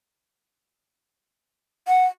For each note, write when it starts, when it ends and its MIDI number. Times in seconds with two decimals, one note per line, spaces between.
1.88 2.05 78